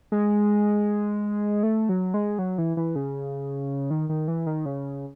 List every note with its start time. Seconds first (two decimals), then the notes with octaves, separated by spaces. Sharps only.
0.12 G#3
1.63 A3
1.89 F#3
2.14 G#3
2.39 F#3
2.58 E3
2.77 E3
2.96 C#3
3.90 D#3
4.09 D#3
4.28 E3
4.46 D#3
4.66 C#3